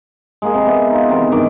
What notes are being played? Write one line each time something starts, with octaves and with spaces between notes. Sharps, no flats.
G#3 A#3 G#4
C3 B5
B3 D5 E5
D#4 F4
C3 D#3 E3 B3
G2 D#3 D6